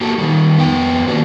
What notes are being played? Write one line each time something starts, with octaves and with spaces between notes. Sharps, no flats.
A#3 F#4 G4 A4
D#3 G3
F2 B3 B4 G5
D#3 A#3 C#4 D4 F#4 G4